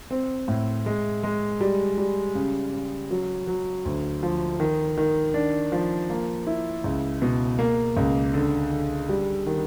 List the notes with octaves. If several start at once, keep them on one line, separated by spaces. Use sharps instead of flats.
C4
A2
G#3
G#3
G3
G3
C#3
C#3
F#3
F#3
D2
F3
D#3
D#3
D4
F3
A#3
E4
C#2
B2
A#3
C#2
D3
D3
G3
D#3